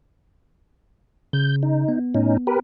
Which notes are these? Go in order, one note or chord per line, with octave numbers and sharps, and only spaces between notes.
C#3 G6
D#4
B3
A2 C#4 D#4
G4 A#4 B4